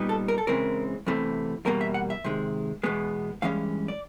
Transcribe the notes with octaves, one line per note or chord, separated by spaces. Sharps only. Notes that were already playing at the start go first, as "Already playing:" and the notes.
Already playing: A#2 G3 B3 D#4
A4
A#4
A4
C#3 E3 G#3 C4 A#4
E2 C3 E3 A3
E2 B2 G3 A#3 A#4
E5
F#5
E5
C3 D#3 G#3
E2 B2 G#3 B3
G2 E3 G#3 C#4 F5
D5